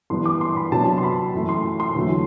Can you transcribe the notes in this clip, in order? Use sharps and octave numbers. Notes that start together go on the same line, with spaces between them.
G2 E3 G3 B3 D4 C6
D6
C6
B5
C3 F#3 B3 D4 A5
C6
B5
F#2 E3 A3
C6
C6
E2 D3 F#3 A3